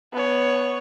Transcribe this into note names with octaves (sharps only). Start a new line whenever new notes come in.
B3 C#5